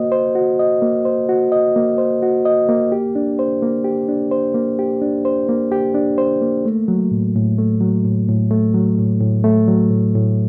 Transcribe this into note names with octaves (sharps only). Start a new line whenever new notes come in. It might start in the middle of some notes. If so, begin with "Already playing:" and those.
Already playing: A#3 F#4 C5 D#5
C5
F#4
D#5
A#3
C5
F#4
D#5
A#3
C5
F#4
D#5
A#3
G4
D4
C5
A#3
G4
D4
C5
A#3
G4
D4
C5
A#3
G4
D4
C5
A#3
A3
F#3
A2
A2
A3
F#3
A2
A2
A3
F#3
A2
A2
A3
F#3
A2
A2